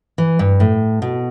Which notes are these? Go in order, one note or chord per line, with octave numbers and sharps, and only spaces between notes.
E3
G2
A2
B2